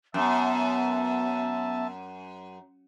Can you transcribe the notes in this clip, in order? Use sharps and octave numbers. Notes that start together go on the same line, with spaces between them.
F#2 B3 E5 A5